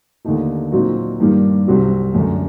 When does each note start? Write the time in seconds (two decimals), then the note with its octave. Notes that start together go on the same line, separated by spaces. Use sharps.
0.25 D#2 D3 A3 D#4
0.72 A#2 F#3 C4 D#4 F#4
1.20 G2 D#3 G3 A#3
1.67 C2 C3 F#3 C4 F#4
2.14 F#2 D3 A3